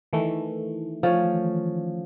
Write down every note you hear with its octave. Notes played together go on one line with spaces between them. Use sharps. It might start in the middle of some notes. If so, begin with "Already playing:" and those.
D#3 E3 A3
F3 C#4 C#5